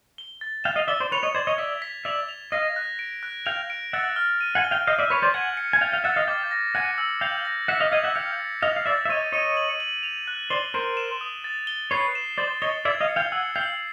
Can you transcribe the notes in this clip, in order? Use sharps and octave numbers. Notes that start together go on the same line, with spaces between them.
G7
A6
F5 G5 E7
D#5 F5
D5 E5 G7
C5 D5
B4 C#5 F7
C#5 D#5
C5 D5 G#6
C#5 D#5
D5 E5 B6
B6
D5 E5 F7
F7
D#5 F5 A#6
F#6
D7
F#6
F5 G5 F7
D7
E5 F#5 A6
F6
D#7
F#5 G#5
G7
F5 G5
D#5 F5 G6
D5 E5
B4 C#5 B6
C5 D5
F#5 G#5 G#6
C#7
G#5
F5 G5 A6
F5 G5
E5 F#5 A6
D#5 F5
F5 G5 D6
A#6
F#5 G#5 C#7
E6
F5 G5 G6
A#6
E5 F#5 B6
D#5 F5
D#5 F5 G#6
E5 F#5
F5 G5 C#7
A6
D#5 F5 F7
F5
D5 E5 A6
E5
C#5 D#5 D#7
C#5 D#5 D#7
F#7
F#7
F7
F#6
C5 D5 G7
A#4 C5 D7
E7
D#6
A6
G7
B4 C#5 C7
E7
C5 D5 A6
C#5 D#5 G7
D5 E5 G#6
D#5 F5
C#7
F5 G5
F#5 G#5 E6
F5 G5 C7